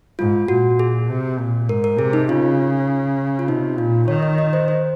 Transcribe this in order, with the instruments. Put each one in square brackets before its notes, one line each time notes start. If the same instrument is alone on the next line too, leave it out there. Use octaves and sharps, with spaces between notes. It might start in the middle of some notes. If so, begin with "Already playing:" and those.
[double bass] G#2 [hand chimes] F4
[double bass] A#2 [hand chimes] F#4
[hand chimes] G#4
[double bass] C3
A#2
[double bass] G#2 [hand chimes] A#4
[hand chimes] A#4
[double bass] C3 [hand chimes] G#4
[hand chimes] D#4
[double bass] C#3 [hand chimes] F4
[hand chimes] F4
[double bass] C3 [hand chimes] D#4
[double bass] A#2 [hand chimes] F4
[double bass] D#3 [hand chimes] C#5
[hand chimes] D#5
D#5
C5
C5